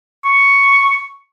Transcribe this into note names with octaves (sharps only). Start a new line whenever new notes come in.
C#6